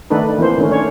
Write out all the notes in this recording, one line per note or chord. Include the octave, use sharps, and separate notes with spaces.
D#3 A3 D4 D#4 A4 B4
E3 A#3 C4 C5
D#3 A3 C#4
C#4 D4 C#5